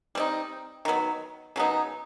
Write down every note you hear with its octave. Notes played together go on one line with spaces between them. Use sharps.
G3 C4 D#4
D#3 F#3 B3
C#3 F#3 B3 D#4